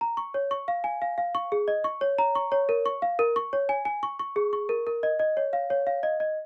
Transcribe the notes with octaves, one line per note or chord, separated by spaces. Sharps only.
A#5
C#6
C#5
C#6
F5
G#5
F5
F5
C#6
G#4
D#5
C#6
C#5
A#5
C#6
C#5
A#4
C#6
F5
A#4
C#6
C#5
G#5
G#5
C#6
C#6
G#4
C#6
A#4
A#4
D#5
D#5
C#5
F5
C#5
F5
D#5
D#5